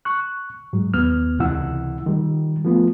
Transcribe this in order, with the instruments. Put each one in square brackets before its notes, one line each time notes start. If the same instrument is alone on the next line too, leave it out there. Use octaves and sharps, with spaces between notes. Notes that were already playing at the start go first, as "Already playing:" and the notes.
[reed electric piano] C#6 F#6
G#2 F#3
D#2 B3 F6
C#2 C3 E3 E4 F#5 E6
D#3 G3
F3 A3 B3 F4